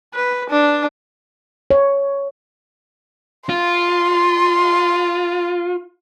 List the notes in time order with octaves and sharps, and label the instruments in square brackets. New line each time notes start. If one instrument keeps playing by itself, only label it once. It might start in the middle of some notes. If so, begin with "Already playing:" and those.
[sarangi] B4
D4
[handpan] C#5
[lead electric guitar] F4 [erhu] C6